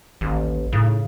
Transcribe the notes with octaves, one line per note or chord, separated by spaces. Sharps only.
A1 D#2
A2 C#3 D#4